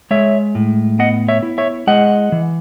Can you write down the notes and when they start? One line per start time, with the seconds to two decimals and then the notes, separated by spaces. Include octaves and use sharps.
0.11 G#3 C#5 E5
0.55 A2
0.99 B3 D#5 F#5
1.28 C#5 E5
1.43 E4
1.58 C#5 E5
1.87 G#3 D#5 F#5
2.32 E3